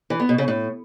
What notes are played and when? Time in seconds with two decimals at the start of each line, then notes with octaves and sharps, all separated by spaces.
0.10 E3
0.20 B3
0.29 B2
0.38 C#3
0.48 A2